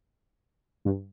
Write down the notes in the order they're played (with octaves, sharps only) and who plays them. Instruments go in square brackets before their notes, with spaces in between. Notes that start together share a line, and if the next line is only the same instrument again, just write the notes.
[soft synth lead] G2